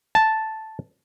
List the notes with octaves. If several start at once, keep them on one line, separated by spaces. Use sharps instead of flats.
A5